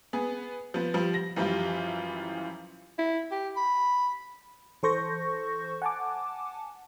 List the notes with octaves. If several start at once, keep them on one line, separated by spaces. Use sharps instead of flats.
B3 G#4
F3 B3
F3 G3
A#6
F#2 E3 F3 G3 F4
E4
G4
B5
E3 A4 C5 C#6 G6 A#6
F#5 G#5 A5 D6